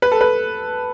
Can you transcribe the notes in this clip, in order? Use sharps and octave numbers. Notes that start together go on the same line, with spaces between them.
B4
A4
B4